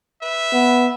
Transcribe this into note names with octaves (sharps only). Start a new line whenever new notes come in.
B4 E5
B3